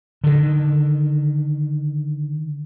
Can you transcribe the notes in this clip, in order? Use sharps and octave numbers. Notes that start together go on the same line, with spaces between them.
D3 D#3